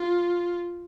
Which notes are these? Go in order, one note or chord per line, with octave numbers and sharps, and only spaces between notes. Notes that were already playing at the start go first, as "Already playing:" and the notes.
Already playing: F4